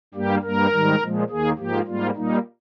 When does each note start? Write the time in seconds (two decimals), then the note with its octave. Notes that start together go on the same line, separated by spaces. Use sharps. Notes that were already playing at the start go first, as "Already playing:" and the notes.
0.14 G2 G3 A#3 G4
0.43 G2 G3 A#3 A#4
0.72 G#2 D#3 G3
1.01 A#2 F3 G#3
1.30 D#2 D#3 A#3 G#4
1.58 G#2 F3 A#3 G4
1.87 G#2 G3 A#3 F4
2.16 A#2 G3 A#3 D#4